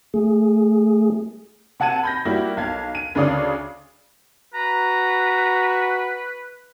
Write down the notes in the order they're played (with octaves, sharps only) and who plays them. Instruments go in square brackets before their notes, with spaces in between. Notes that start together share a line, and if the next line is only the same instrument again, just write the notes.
[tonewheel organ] A3 G#4
[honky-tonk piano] C3 F#5 A5 G#6 D#7
B5 G6 A#6
G3 A#3 E4 F#4
B1 F5 G#6
D#7
D2 C#3 C#4 D5 F5 D#6
[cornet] F#4 [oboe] B4 [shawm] A#5